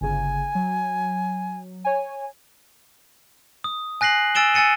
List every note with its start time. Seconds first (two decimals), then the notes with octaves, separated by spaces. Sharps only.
0.01 G1 C#3 G#5
0.55 F#3
1.85 C#5 G#5
3.64 D#6
4.01 G#5 F#6 A#6 C7 F#7
4.35 G#5 E6 A6 D7 E7 G7
4.54 G#5 E6 A6 C#7 D#7